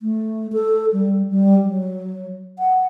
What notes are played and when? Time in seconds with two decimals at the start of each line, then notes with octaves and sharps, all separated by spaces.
0.01 A3
0.53 A4
0.93 G3
1.31 G3
1.65 F#3
2.59 F#5